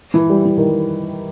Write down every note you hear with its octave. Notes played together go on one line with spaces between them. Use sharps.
E3
G3
E3
D#3
G3